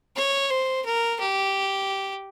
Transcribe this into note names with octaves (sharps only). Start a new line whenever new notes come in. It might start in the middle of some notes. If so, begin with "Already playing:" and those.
C#5
C5
A#4
G4